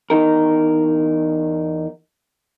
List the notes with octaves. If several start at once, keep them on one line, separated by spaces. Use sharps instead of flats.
E2 D#4 A#4